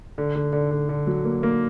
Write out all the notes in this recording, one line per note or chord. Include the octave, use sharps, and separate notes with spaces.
D3
D3
D3
D3
D3
F#3
A#3
A#3